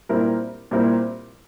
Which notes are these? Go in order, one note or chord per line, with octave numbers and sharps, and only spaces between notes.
A#2 G3 C4 E4 A#4
A#2 G3 C4 E4 A#4